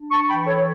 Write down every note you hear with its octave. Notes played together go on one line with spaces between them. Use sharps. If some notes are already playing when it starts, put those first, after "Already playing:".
Already playing: D4
A5 C#6
E3 G5 B5
A4 C#5